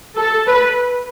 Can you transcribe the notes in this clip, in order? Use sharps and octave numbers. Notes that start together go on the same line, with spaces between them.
A4
B4